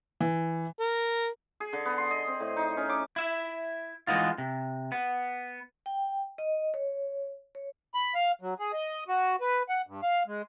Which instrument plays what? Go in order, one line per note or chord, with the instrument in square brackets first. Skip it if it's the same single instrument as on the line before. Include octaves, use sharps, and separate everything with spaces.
[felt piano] E3
[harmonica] A#4
[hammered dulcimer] G#4
D3
B3
C6
D#5
C4
A2
D#4
C#4
D6
[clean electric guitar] E4 E5
E3 G#3 A#3 B3 D#4 F4
C3
B3
[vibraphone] G5
D#5
C#5
C#5
[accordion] B5
F5
F#3
G#4
D#5
F#4
B4
F#5
G2
F5
G#3